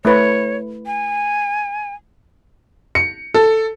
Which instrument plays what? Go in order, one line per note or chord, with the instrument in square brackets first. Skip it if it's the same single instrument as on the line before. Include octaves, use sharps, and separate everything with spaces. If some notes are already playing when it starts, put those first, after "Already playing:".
[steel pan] A3 E4 B4 [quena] C#5
[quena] G#5
[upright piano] C#7
A4